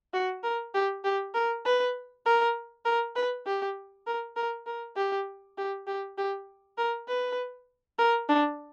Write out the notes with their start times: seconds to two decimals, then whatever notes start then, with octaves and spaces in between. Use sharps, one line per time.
0.13 F#4
0.43 A#4
0.74 G4
1.04 G4
1.34 A#4
1.65 B4
2.26 A#4
2.85 A#4
3.16 B4
3.46 G4
4.06 A#4
4.36 A#4
4.66 A#4
4.96 G4
5.58 G4
5.87 G4
6.18 G4
6.77 A#4
7.08 B4
7.98 A#4
8.28 D4